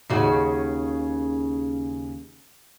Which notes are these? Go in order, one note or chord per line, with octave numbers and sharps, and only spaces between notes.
D#2 C#3 F#4